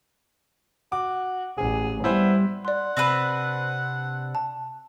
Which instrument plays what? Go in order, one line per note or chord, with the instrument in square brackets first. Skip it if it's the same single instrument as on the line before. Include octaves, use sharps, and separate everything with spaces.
[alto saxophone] F#4 [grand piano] D6
[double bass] A1 [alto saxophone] G#4
[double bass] G3 [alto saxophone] B3 [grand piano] E4 C5 E5
[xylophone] D5 C6 [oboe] F#5
[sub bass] C3 [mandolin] C4 D4 B4
[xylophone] A5